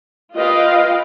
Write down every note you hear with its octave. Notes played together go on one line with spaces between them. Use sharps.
F4 B4 D#5 F5 G5